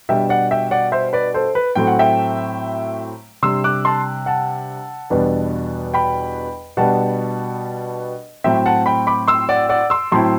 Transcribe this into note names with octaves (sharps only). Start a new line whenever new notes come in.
B2 G3 D4 E5 G5
D5 F#5
E5 G5
D5 F#5
C5 E5
B4 D5
A4 C5
B4
A2 F#3 A3 C4 G5
F#5
E5 G5
C3 G3 D4 C6 E6
D6 F#6
A5 C6
F#5 A5
E2 B2 G3 B3 D4
G5 B5
B2 G3 B3 D4 F#5 A5
A2 F#3 C4 E5 G5
F#5 A5
G5 B5
B5 D6
C6 E6
D5 F#5
D5 F#5
C6 E6
A2 F#3 C4 E4 A5 C6